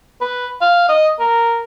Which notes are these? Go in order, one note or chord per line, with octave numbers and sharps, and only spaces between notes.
B4
F5
D#5
A#4